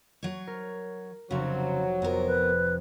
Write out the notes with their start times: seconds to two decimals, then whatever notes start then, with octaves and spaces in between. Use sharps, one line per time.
0.23 F#3 C#5
0.47 A#4
1.31 F1 C#3 F#3 C4
2.02 F2 B3 A#4
2.27 B4